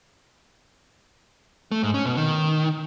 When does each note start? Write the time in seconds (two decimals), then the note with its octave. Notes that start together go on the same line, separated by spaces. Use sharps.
1.72 A3
1.83 G#2
1.94 C#4
2.05 B2
2.17 D#3